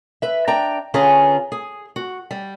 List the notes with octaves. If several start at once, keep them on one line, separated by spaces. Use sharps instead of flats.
B4 E5
D4 G5 A#5
D3 C#4 F4 G#4 B4 A#5
G#4
F#4
G3